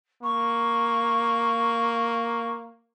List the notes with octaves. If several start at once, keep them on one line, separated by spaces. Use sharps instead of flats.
A#3 C#6